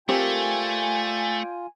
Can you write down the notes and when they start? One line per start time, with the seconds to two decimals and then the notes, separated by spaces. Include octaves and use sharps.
0.09 A3 C4 F4 G4 A#4 D5 G5 G#5